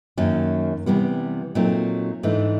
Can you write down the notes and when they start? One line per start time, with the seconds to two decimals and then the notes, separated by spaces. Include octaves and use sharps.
0.17 F#2 D#3 F#3 A#3 C#4
0.86 C3 E3 G3 B3
1.55 A#2 F#3 A3 C4 D#4
2.23 G#2 E3 A3 D4